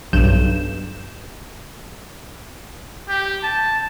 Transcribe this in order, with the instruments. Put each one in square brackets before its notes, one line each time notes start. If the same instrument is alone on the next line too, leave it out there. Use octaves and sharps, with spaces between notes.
[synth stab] B1 G2 G6 E7
[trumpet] G4
A5